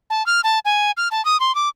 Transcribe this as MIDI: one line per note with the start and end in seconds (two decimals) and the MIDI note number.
0.10 0.25 81
0.26 0.40 89
0.44 0.59 81
0.65 0.91 80
0.97 1.08 89
1.11 1.23 81
1.25 1.39 87
1.40 1.54 84
1.55 1.69 86